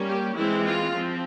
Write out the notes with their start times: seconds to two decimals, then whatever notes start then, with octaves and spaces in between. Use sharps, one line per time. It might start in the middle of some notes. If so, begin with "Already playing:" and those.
Already playing: G3 A#3 C#4
0.09 G4
0.37 E3 G#3 C4 E4
0.66 F4
0.93 F3 C4